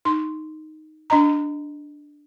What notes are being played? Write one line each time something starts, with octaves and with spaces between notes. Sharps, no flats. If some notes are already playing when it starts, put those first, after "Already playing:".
D#4 C6
D4 D#5 A#5